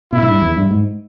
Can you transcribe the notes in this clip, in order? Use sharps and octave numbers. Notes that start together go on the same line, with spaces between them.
B2 E4
G#2
G2
E2
G2
G#2